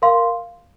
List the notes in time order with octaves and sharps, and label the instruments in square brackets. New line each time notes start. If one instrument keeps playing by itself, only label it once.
[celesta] A#4 F5 C6